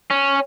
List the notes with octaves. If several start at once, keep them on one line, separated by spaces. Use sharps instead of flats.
C#4